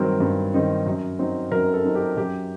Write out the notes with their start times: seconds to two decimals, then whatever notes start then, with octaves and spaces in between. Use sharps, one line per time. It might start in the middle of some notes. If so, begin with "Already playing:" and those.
Already playing: G2 D#3 F#3 C4 D#4 A#4
0.21 G2
0.54 D#3 F#3 C4 D#4
0.87 F#2
1.19 F#3 C4 D#4
1.52 F#2 A#4
1.73 A4
1.85 F#3 C4 D#4
1.95 G4
2.17 F#2 G4